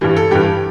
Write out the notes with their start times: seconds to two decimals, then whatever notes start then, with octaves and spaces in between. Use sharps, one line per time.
0.01 G2 E3 G3
0.17 A4
0.31 G2 E3 G3 G4